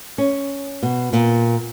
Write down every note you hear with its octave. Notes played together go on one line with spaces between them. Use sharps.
C#4
B2
A#2